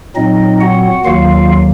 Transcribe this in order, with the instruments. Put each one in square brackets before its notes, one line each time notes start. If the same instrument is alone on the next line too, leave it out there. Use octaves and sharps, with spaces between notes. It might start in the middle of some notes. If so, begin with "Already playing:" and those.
[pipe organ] A#2 F#3 C4 D#4 D#5
F#4 F#5
D#2 D#3 F#3 A#3 F4 F5